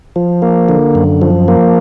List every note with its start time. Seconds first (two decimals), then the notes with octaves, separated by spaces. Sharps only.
0.16 F3
0.42 A#3
0.69 D3
0.95 F#2
1.22 F3
1.48 A#3